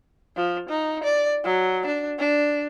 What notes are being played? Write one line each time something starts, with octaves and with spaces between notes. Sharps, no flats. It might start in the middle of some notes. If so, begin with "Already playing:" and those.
F3
D#4
D5
F#3
D4
D4